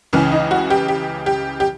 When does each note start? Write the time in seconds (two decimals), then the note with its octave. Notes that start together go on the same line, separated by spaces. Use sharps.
0.13 C#2 C#3 E3 C#4
0.32 D#4
0.51 F#4
0.70 G4
0.88 G4
1.26 G4
1.60 G4